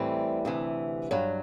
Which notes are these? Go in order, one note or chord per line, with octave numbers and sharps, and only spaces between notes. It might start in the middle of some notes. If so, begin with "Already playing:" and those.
Already playing: A2 E3 G3 C4
D2 C3 E3
G2 F#3